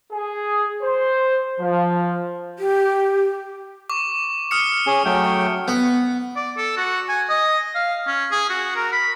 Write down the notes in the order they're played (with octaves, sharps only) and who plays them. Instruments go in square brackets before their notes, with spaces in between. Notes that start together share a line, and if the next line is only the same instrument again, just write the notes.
[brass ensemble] G#4
C5
F3
[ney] G4
[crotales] C#6 D6
D#6 F6 C#7
[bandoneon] C#4 G#4
F#3 A3 G5
[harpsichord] B3
[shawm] D5
A4
F#4
G#5
D#5
F5
C#4
G#4
F#4
A#4
B5